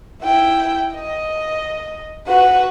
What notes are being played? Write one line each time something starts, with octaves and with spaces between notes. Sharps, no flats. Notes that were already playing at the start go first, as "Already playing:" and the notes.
E4 G5
D#5
F#4 B4